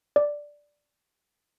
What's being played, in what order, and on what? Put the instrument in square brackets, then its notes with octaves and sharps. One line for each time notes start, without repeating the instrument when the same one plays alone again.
[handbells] D5